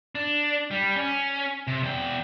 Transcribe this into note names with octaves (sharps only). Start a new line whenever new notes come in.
D4
G3
C#4
C3
E2 G5